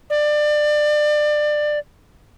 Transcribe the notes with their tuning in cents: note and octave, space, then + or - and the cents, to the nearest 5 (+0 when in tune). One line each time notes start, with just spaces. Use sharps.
D5 +25